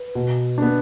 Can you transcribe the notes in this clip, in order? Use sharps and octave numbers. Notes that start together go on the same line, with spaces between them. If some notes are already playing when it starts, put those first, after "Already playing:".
Already playing: B4
B2
B3 D4